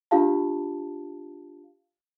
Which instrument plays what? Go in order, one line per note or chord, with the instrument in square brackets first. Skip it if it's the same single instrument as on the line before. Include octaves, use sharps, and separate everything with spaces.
[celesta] D4 F4 G4 F5 A5